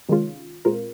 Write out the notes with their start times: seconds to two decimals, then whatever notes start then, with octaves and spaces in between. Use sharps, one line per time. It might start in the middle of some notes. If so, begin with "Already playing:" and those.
0.09 C3 D#3 G#3 C#4 F4
0.65 A#2 G#3 C4 F4 A#4